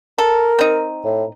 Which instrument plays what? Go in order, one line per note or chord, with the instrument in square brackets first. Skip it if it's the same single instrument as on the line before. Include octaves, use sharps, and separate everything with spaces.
[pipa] A4 [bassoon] A#4
[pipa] C4 D#4
[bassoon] A2